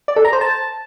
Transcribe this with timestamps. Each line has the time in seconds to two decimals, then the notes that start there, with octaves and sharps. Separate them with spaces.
0.08 D5
0.16 A4
0.25 A#5
0.33 C5
0.41 A5